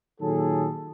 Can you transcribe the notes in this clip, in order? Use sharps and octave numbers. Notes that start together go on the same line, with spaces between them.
A#2 D#3 F#3 G#4 A4